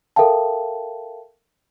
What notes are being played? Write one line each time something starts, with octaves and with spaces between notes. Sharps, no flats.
A4 A#4 E5 F5 G5 A5